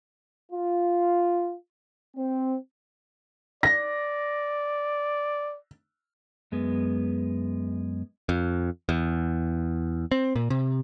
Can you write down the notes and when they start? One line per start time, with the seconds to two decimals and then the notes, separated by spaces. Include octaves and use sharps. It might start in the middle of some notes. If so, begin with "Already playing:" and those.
0.52 F4
2.16 C4
3.63 D5 A#6
6.52 F#2 G#3 B3
8.29 F2
8.89 E2
10.12 C4
10.36 A#2
10.50 C3